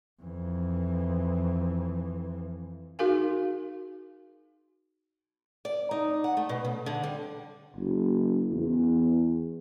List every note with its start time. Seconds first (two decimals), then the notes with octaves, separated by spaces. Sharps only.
0.23 F2 E3
2.99 D#4 F#4 G#4 A#4 F5 G#5
5.65 D5
5.91 D#4
6.24 F#5
6.37 A3
6.49 B2
6.65 C#3
6.86 D3
7.03 G3
7.77 F#1
8.53 E2